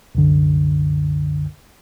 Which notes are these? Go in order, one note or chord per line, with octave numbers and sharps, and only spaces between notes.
C2 F#2 D3